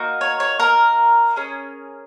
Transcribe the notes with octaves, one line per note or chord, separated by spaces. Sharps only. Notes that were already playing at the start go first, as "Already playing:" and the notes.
Already playing: A#3 D#4 F#4
C#5
C#5
A#4
C#4 G#4